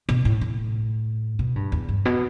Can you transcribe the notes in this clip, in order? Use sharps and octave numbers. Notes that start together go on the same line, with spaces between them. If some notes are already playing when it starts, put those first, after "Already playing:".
B2
A2
A2
B2
G2
E2
G2
B2